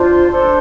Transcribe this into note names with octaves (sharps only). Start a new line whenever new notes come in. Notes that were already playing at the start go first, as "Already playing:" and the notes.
Already playing: D4 F4 C5
C6
D4 A4 C5 C6